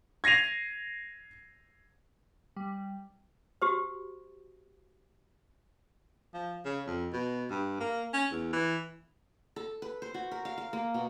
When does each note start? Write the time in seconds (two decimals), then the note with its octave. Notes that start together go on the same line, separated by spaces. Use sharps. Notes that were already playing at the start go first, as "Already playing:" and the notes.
0.24 G#6 A#6 C7 D#7 F7
2.56 G3
3.62 F#4 G4 C5
6.34 F3
6.65 C#3
6.87 F2
7.13 B2
7.50 G2
7.80 A#3
8.13 C#4
8.31 E2
8.53 E3
9.56 A4
9.82 B4
10.02 C5
10.14 F#4
10.31 A#4
10.45 F5
10.58 F5
10.73 A#3
10.94 B2